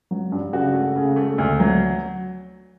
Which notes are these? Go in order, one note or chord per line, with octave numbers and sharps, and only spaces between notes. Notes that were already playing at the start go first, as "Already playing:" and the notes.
F#3
G2
C#3 F#4
A3
C#3
A3
D2
F#3